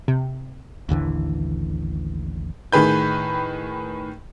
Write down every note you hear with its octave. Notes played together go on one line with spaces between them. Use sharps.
C3
A1 D#2 D3 E3
A2 D#3 G#4 B4 G6